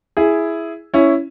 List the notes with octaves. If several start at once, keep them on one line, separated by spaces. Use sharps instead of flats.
E4 G#4
C#4 E4